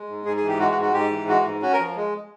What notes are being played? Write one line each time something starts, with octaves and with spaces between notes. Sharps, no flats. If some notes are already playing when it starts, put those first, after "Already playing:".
Already playing: G#3
G#2
G#2 G#4
G#4
E3
G4
G#3 F#4
F#4
G#2
F#4
G#2 G4
E3
G#3 F#4
G#2
C#4 F#4
A#4
F3
G#3